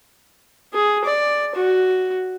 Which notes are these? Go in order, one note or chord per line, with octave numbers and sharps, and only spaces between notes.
G#4
D5
F#4